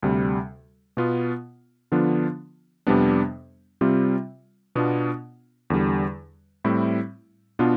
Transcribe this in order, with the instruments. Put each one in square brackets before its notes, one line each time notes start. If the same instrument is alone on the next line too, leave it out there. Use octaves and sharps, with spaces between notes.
[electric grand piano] D2 C3 G3
B2 B3 F4
D3 F3 B3 D4 F4
F2 C3 G3 B3 D4
C3 G3 C4 F4
B2 B3 D4 F4
E2 D3 G3
A2 G3 C4 E4
B2 B3 D4 F4